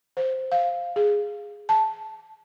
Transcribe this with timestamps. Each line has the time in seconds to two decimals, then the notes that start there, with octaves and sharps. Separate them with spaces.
0.17 C5
0.52 F5
0.96 G#4
1.69 A5